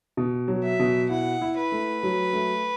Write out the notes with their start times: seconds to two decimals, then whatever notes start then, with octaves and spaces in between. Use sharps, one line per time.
0.17 B2
0.48 F#3
0.64 E5
0.80 B2
1.10 E4 F#5
1.42 E4
1.57 B4
1.72 A3
2.03 F#3
2.33 A3